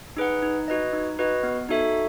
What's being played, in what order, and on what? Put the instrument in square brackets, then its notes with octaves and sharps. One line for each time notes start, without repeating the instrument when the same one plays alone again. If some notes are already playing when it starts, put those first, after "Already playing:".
[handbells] D#4 G#4 B4 F#5
D#4
F#4 B4 D#5
D#4
F#4 B4 D#5
B3
D#4 F#4 A4 E5